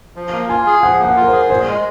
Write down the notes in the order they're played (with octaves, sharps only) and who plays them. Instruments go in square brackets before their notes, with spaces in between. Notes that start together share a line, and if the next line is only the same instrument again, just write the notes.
[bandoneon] F3
A#3
[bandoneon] F4 [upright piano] G#5
[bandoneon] G#4
[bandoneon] F3 [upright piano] F#5
[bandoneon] A#3
[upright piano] F#5
[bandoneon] F4
[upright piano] A#4
C5
[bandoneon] G#4
[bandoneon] A#2 [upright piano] C5
[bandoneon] G#3